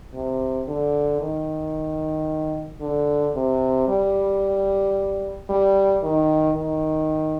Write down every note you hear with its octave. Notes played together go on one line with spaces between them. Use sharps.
C3
D3
D#3
D3
C3
G3
G3
D#3
D#3